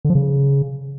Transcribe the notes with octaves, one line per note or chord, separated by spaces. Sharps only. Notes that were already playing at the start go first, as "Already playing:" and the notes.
D3
F3
C#3